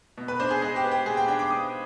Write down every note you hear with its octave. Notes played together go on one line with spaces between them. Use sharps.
B2
B4
D4 C5
G#4
G#3 G#4
G4
B3
G4
B2 G#4
G5
D4 G5
D6
G#3 D#6